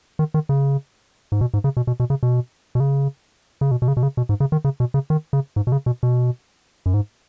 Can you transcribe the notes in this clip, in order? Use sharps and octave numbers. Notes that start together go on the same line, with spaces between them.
D#3
D#3
C#3
G#2
B2
G#2
C#3
B2
B2
B2
C#3
B2
B2
C#3
C#3
B2
B2
C#3
B2
C#3
B2
G#2
C#3
D#3
C#3
B2
C#3
D#3
C#3
G#2
B2
C#3
B2
B2
F#2
G#2